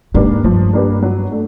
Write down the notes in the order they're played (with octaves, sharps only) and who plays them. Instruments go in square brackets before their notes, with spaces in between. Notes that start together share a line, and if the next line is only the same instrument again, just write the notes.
[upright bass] G#2 [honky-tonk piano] A#3 D4 G4 B4
[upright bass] G2 [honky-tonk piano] F3
[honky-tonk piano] A#3 D4 G4 B4
F#3
A3 D4